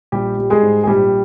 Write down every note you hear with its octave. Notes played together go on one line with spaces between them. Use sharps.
A#1 G3 G4
G3
G#3 G#4
G#2
G#4
A#1 G3 G4